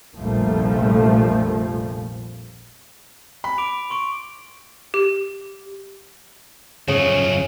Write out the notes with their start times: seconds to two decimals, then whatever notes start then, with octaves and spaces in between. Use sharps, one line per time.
0.18 F1 A#1 A#2 F3 G3 A3
3.44 B5
3.58 D6 D7 F7
3.90 C6 C#6 D7
4.94 G4
6.88 F#2 C#3 F3 C#4